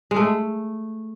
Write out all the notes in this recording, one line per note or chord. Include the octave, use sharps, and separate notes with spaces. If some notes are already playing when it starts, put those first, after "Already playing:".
G#3
A3